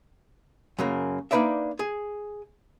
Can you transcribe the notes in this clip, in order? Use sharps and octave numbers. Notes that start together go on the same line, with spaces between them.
F#2 C#3 A#3
A#3 D4 D#4 B4 D5 E5
G#4